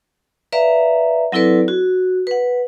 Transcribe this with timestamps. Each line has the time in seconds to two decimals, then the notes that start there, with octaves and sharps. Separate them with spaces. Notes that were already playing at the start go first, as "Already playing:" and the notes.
0.52 B4 D5 E5 F5 A#5
1.32 F#3 C4 E4 A4 B4 D5
1.68 F#4
2.27 B4 F#5